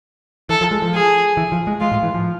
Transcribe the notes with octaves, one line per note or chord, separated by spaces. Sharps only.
E3 A4
F3
G#3
F3
G#4
E3
F3
G#3
G#3 F4
A2
E3
F3